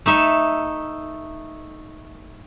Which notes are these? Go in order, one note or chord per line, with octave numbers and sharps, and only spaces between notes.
A3 D#4 E5